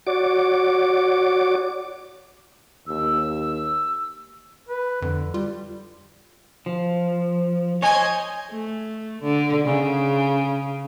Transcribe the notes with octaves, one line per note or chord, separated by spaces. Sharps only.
F#4 C#5 D5 D6
D#2 E6
B4
F2 D3
G3 F4
F3
C5 C#5 D#5 G#5
A3
D3
C#3